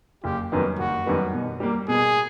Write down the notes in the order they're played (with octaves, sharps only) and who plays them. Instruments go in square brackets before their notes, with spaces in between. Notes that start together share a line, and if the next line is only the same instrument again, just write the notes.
[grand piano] F#1 [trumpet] G4
[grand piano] F#2 D#3 G3 B3
[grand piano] F#1 [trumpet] F#4
[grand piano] F#2 D#3 G3 B3
B2
G3 A#3
[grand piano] B2 [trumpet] G#4